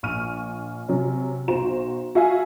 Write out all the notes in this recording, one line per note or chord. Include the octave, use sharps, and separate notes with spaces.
A#1 C#6 F6 D#7
C3 F#3 C#4
B1 F#4 C5 A#5 E7
F#4 E5 F5 G#5